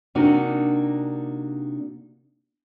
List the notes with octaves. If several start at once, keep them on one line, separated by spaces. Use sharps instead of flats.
C3 A#3 D4 D#4 F#4